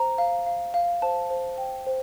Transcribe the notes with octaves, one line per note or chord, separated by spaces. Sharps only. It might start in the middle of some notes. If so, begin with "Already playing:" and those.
Already playing: C5 A#5
F5
F5
F5
C5 A5
C5
G5
C5